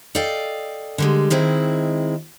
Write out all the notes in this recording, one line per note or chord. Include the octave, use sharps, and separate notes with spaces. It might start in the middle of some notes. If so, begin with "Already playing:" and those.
A4 D5 D#5 F5 G5
D3 G3 G#3
D#3 G#3 C4 E4